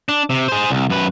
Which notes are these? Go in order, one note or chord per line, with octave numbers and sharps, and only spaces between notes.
D4
C3
G#4 C5
C2
F#2 B4